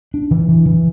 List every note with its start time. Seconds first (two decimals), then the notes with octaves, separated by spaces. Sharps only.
0.14 D4
0.31 E3
0.48 E3
0.66 E3